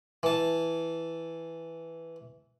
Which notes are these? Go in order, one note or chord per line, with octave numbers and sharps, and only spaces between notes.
E3 A5